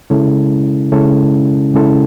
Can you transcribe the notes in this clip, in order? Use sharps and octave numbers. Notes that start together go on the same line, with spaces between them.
C#3 G#3 C#4 E4 A4
C#3 G#3 C#4 E4 A4
C#3 G#3 C#4 E4 A4